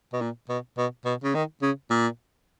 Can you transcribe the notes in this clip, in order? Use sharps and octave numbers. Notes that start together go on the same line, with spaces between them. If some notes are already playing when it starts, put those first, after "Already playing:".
B2
A#2
B2
B2
B2
C#3
D#3
C#3
A#2